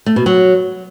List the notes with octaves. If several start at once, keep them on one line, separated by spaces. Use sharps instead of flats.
A3
B2
F#3